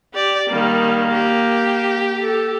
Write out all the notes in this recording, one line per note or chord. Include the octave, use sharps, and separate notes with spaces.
G4 D5
D#3 G3 A#3
G4
A4